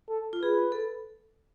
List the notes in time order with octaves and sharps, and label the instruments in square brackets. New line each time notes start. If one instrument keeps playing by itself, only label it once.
[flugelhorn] A4
[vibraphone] F4
[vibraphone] G#4 [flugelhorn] B4
[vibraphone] A4